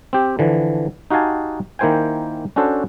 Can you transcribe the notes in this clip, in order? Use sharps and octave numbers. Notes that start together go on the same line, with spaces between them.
C4 G4
D3 E3 F3
D#4 F#4 G4 F5 G#5 A5
D#3 A#3 E4 C5 G5 G#5
C#4 D4 F#4 A4 C5